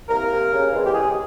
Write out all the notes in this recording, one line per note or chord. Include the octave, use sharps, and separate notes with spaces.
C2 A#3 A#4
C3 G3
C#3
E3 G#3 C4
G4
C#3 G#3 G#4